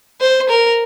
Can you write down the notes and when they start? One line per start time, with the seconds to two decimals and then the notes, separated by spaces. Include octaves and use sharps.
0.21 C5
0.49 A#4